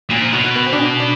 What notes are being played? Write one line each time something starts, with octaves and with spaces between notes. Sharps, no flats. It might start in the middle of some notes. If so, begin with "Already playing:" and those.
A#2 F#3
F3
B2 F#3
F#3
B3
C4
D4
C#4
D4